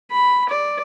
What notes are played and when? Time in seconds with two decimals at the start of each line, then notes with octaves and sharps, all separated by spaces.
0.11 B5
0.49 D5